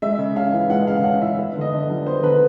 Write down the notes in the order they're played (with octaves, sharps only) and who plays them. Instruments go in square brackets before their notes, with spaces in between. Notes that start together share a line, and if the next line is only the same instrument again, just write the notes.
[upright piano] G#3 E5
C#3
C#4 F5
E3
G#3 F#5
C#3 F5
C#4 F#5
E3 E5
B3 E5
D3
D#5
D3
G3
B3 C5
D3 B4